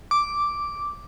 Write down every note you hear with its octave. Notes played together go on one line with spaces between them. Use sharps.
D6